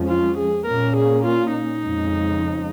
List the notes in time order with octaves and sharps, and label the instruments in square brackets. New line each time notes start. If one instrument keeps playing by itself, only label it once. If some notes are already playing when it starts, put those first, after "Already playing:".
Already playing: [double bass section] F2 F3 G#3 C#4
[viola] F4
G#4
[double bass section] A#2 A#3 C#4 [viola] A#4
[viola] G#4
F4
D#4
[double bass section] F2 C#3 G#3